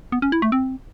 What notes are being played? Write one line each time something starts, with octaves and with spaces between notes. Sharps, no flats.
B3
C#4
E4
A3
C4